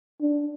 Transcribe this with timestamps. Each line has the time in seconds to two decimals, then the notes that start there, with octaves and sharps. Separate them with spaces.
0.21 D4